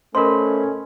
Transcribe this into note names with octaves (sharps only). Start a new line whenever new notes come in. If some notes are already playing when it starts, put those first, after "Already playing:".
A3 C#4 A#4 C5 D#5 B5 C6